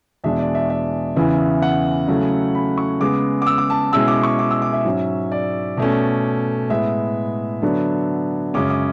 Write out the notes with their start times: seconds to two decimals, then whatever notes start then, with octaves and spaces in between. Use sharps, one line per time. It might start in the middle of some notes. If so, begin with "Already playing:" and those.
0.24 E2 B2 G#3 D4 E5
0.39 D5
0.55 E5
0.70 E5
1.16 E2 C#3 E3 B3 E4
1.62 F#5
2.08 C#3 F#3 A3 E4
2.55 B5
2.78 C#6
3.00 C#3 G#3 B3 D6
3.42 D6
3.47 E6
3.58 D6
3.70 A5
3.93 B2 G#3 C#4 E4 E6
4.08 D6
4.23 C#6
4.39 D6
4.51 E6
4.62 D6
4.73 E5
4.85 G#2 F#3 C#4
5.32 D5
5.77 B2 A3 C#4
6.69 A2 G#3 B3 E5
7.62 D3 F#3 B3 D4
8.54 F#2 C#3 G#3 C#4 D6
8.70 D6